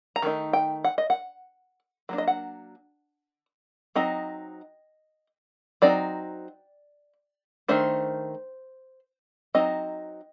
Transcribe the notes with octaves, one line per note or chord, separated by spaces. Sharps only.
A#5
D#3 A3 D#4
G5
F#5
D#5
F#5
F#3 A#3 D4
D#5
F#5
F#3 C4 D#4 D#5
F#3 C4 D#4 D5
D#3 A3 D4 C5
F#3 C4 D#4 D#5